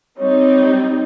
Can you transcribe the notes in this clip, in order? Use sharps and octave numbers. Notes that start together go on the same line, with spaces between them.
G3 C4 D#4 C#5